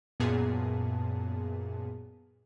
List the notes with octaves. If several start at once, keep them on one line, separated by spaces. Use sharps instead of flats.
F#2 A#2 B3 G#4 A5